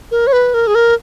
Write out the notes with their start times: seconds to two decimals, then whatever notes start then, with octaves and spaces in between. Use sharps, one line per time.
0.11 A#4
0.27 C#5
0.33 B4
0.54 A#4
0.67 G#4
0.75 A#4